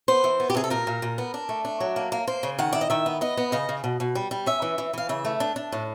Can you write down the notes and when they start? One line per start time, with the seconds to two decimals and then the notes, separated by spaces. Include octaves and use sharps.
0.08 B3 C5
0.24 E3
0.40 B3
0.50 G4
0.55 C3 G#4
0.64 A4
0.70 A#2 A#4
0.87 A#2
1.02 A#2
1.18 B3
1.34 D4
1.49 A3
1.65 D4
1.80 F#3
1.96 A#3
2.12 A#3
2.27 A#3 C5
2.43 C#3
2.58 D#3 F#5
2.73 E4 D5
2.81 D#5
2.90 D#3 E5
3.06 B3
3.21 B3 D#5
3.37 B3
3.52 C#3 D#5
3.69 C#3
3.84 B2
4.00 B2
4.15 G3
4.31 G3
4.46 C#4 E5
4.62 E3
4.78 E3
4.93 E3 F5
5.09 C#3 E5
5.25 A3
5.40 D4
5.56 D4
5.72 A2